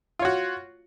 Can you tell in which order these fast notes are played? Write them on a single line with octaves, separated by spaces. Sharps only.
F4 C#5 F#4